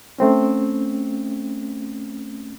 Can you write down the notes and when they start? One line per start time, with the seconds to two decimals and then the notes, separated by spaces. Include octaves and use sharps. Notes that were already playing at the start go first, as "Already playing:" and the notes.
0.18 A3 C4 C#4